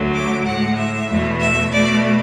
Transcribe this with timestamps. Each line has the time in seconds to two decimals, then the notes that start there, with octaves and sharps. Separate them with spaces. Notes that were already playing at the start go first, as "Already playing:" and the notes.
Already playing: D2 D3 F#3 A3
0.14 D6
0.45 A2 G#3 F#5
0.77 E5
1.09 E2 B2 A3
1.41 E5
1.72 B2 A3 D5